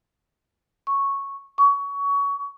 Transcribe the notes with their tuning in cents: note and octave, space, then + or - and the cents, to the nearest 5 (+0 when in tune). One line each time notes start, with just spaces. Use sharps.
C#6 -5
C#6 +25